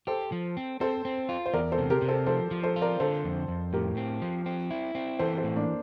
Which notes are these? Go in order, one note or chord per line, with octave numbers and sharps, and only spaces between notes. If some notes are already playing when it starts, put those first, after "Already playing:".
G4 A4 C5
F3
C4
C4 A4 C5
C4
F4
C5
E2 A#4 D5
A4 C5
C3
G4 A#4
C3
A4 C5
F3 A4 C5
F3
A4 C5
F4
A#4 D5
D3 A4 C5
F2
F2
A2 G4 A#4
C4
F3
C4
E4
C4
E3 A4 C5
A4 C5
A2
A#3 D4